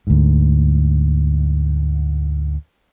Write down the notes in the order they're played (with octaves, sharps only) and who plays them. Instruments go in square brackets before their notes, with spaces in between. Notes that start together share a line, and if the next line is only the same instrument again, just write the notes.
[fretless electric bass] D2 G#2